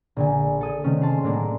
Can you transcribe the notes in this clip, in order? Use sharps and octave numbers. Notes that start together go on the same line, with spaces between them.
A#1 D3 G#5
A4 D#6 G#6
C3 D#3 A3 C#4
G#4 C#5 A5 C6
A2 F#3 G#3 A#3 D4